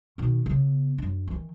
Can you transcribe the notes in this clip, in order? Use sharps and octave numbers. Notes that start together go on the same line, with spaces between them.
B2 D#3
C#3 B3
F#2 D4
D#3 E3